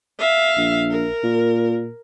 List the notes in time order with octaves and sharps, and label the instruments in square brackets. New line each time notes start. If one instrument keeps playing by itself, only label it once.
[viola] E5 F5
[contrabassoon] A#1
[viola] A#4
[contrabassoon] A#2